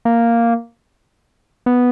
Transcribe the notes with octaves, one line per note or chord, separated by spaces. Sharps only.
A#3
B3